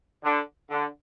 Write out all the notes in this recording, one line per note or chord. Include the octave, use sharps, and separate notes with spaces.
D3
D3